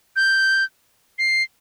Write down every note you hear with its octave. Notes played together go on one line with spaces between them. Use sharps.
G6
C7